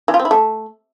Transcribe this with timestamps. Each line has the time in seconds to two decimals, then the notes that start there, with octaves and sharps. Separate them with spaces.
0.08 E3
0.14 F4
0.19 C4
0.25 E4
0.31 A3